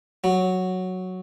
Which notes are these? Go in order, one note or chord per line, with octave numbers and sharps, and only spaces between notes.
F#3